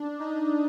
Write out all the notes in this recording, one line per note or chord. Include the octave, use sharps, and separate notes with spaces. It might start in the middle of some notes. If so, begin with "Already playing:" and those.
Already playing: D4
D#4